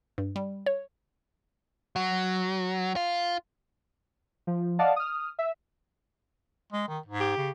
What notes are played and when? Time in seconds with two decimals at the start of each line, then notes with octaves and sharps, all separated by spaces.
0.18 G2
0.36 G3
0.66 C#5
1.96 F#3
2.96 F4
4.47 F3
4.79 D5 D#5 F5 F#5 A5
4.96 D#6 F6
5.39 E5
6.73 G#3
6.88 D#3
7.06 G#2
7.20 G4
7.37 C#3